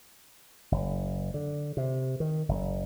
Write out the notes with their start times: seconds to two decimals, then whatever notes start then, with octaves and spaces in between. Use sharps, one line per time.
0.72 F#1
1.34 D3
1.77 C3
2.20 D#3
2.49 F#1